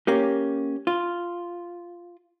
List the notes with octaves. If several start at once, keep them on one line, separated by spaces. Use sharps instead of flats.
A#3 C#4 G4
F4